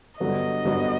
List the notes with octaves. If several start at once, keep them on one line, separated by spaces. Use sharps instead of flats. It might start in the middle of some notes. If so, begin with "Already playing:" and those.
G2 D3 F#3 B3 D#5
G2 D3 F#3 B3